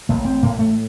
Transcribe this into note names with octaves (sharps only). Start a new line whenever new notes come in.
A1 A#3
C4
A2 A#3
A3